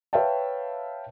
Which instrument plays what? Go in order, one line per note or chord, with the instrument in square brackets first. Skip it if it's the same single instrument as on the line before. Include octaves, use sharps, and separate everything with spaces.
[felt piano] B4 C#5 E5 F5 G5 A5